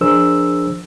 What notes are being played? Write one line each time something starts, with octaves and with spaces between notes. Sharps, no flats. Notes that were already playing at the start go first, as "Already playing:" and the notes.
F3 D4 G#4 A#4 C5 E6